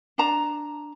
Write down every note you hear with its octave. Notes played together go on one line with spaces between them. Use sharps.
D4 A5 A#5